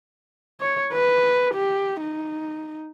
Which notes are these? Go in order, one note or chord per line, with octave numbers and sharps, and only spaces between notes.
C#5
B4
G4
D#4